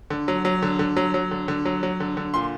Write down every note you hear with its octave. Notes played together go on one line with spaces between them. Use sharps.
D3
F#3
F#3
D3
D3
F#3
F#3
D3
D3
F#3
F#3
D3
D3
A#2 C6